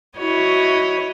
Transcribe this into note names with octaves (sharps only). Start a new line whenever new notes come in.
E4 F#4 C#5 D#5